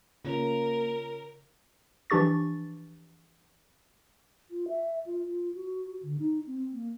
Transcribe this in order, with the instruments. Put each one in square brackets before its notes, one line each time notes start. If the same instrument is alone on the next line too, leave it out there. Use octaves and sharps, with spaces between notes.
[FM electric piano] C#3 [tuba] A#3 [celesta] F4 C#5 F7 [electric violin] A#4
[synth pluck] E3 F3 D4 G4 C#6 A6
[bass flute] F4
E5
F4
F4
F#4
F#4
D3
D#4
C4
A#3